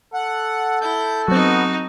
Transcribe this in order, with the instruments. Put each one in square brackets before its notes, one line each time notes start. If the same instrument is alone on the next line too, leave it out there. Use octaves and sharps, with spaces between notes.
[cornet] A4 [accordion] F#5
[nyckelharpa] E4 [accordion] G6
[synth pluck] F#3 C4 [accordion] B3 [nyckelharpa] D#4 F#4